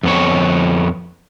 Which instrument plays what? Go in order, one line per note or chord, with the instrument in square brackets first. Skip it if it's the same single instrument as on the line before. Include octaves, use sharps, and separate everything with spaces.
[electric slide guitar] F2 B3 C#5